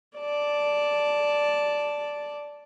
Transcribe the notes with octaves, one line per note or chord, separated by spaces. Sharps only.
D5 A5